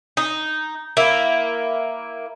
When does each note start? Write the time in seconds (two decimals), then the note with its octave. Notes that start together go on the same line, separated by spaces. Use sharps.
0.17 D#4
0.97 A#3 E4